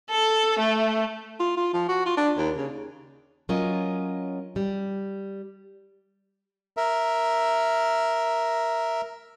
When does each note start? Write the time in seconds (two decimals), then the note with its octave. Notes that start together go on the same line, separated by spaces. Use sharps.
0.11 A4
0.59 A3
1.40 F4
1.57 F4
1.74 F3
1.89 F#4
2.06 F4
2.17 D4
2.37 D#2
2.57 C#3
3.49 F#3 C#4 F4 A#4 D#5
4.56 G3
6.77 A#4 E5